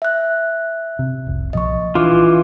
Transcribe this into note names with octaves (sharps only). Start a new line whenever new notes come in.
E5 F#6
C3
F1 C2
B1 A#2 F3 D#5 C#6
E3 D4 F4 D6